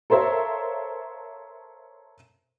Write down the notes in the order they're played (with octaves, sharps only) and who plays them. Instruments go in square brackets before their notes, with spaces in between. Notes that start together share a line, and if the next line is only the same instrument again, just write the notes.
[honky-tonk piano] A4 A#4 C5 C#5 E5 F5